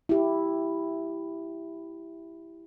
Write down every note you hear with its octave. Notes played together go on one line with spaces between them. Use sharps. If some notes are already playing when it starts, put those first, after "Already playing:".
E4 G4